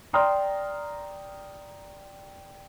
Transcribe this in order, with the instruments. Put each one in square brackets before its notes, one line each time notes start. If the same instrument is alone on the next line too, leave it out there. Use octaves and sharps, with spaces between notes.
[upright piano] D5 G5 A#5 C6 D#6 F6